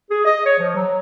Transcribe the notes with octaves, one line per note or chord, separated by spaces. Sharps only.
G#4
D#5
C#5
F3
F#3